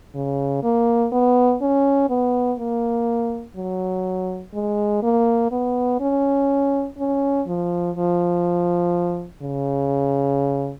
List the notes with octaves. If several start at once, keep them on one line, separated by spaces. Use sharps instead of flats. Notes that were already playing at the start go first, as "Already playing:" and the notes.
C#3
A#3
B3
C#4
B3
A#3
F#3
G#3
A#3
B3
C#4
C#4
F3
F3
C#3